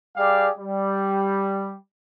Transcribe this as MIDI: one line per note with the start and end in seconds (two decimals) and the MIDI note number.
0.17 0.48 55
0.17 0.48 67
0.17 0.48 68
0.17 0.48 74
0.17 0.48 77
0.17 0.48 79
0.58 1.75 55